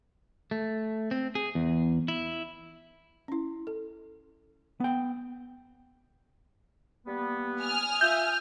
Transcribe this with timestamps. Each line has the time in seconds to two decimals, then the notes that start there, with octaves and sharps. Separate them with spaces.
0.51 A3
1.11 C4
1.35 G#4
1.55 E2
2.08 E4
3.28 C#4 E4
3.67 A4
4.80 B3 G5
7.06 G3 A#3 B3
7.60 G#5 D#6 F6
8.01 F4 E5 G6